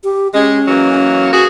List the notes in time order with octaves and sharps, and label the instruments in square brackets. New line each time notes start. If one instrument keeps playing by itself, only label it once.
[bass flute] G4
[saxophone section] G#3 [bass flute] C#4
[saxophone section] E3 F#3 A#3
A#3 F#4 G#4